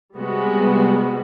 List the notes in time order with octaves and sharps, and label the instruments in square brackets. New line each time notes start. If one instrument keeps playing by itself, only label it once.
[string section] C3 G3 G#3 B3 F#4